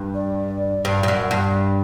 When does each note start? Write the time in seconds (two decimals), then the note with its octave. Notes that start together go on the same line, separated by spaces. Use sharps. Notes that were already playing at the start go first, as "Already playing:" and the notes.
Already playing: G2
0.15 D5
0.85 G2
1.03 G2
1.08 F#2
1.31 G2